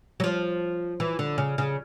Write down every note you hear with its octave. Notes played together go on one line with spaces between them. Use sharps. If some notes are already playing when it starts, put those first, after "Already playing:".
F#3
F3
E3
D3
C#3
C#3